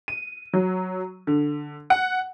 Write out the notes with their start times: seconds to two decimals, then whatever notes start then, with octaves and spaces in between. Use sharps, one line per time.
0.08 D#7
0.53 F#3
1.27 D3
1.90 F#5